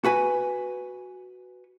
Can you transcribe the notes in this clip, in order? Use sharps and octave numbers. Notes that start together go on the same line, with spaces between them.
F#4 B4 G#5